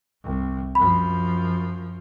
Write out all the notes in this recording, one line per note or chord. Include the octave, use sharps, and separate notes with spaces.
C2
F#2 F3 B5